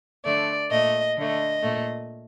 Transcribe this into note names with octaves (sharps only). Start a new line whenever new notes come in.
D3 A3 D5
A#2 A3 D#5
D3 A3 D#5
A#2 A3